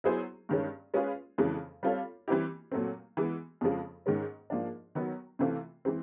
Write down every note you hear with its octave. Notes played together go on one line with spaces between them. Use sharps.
F#3 B3 E4 G#4 C5
G2 D#3 G#3 C#4
G#3 C#4 F4 G#4 B4
F2 C#3 E3 G#3
G3 C4 F4 A4 C#5
E3 G3 C4 E4 G4
A#2 F#3 A3 C4
E3 G#3 B3
F2 C#3 F3 G#3
G#2 D#3 G#3 C#4
G#2 F3 A#3 D4
D#3 F#3 B3
C3 E3 A3 C4 F4
E3 G#3 C4